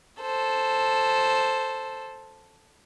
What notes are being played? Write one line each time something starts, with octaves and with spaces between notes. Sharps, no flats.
A4 C5